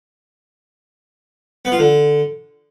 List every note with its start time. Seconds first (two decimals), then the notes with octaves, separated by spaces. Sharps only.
1.65 B3
1.72 F4
1.79 D3